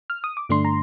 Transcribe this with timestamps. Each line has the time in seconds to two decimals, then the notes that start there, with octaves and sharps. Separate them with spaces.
0.10 F6
0.24 D#6
0.37 D6
0.49 G2 D3 A3 D4 C6
0.65 A#5